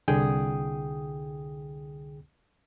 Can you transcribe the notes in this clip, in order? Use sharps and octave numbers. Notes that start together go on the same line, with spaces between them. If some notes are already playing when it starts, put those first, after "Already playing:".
C2 D3 G#4 G5 D#6